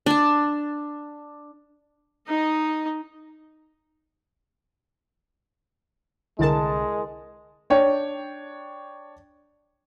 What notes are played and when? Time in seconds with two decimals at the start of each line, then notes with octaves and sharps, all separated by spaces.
0.06 D4 A5
2.27 D#4 D#5
6.39 C2 D3 G#3 E4 A#4 A5
7.70 D4 C#5 G5